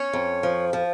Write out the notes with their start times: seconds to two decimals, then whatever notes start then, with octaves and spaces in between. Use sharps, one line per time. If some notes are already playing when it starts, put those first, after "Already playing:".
Already playing: C#4 C#5
0.13 F2
0.43 F3
0.73 F3